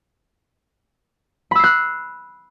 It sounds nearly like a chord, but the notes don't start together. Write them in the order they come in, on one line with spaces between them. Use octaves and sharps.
B5 E6 C7 F#6